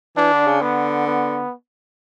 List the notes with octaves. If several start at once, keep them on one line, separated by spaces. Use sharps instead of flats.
E3 D4
D3
C#3
D3 B3
B3